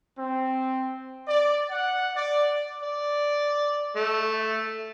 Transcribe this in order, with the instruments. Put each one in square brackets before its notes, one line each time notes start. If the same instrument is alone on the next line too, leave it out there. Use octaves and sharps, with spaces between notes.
[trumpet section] C4
D5
F#5
D5
[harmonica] D5
A3